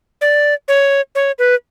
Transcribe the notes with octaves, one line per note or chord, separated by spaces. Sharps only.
D5
C#5
C#5
B4